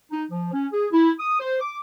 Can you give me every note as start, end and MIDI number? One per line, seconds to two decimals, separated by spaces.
0.12 0.24 63
0.31 0.51 53
0.53 0.67 61
0.73 0.86 68
0.92 1.11 64
1.20 1.38 87
1.40 1.56 72
1.61 1.79 86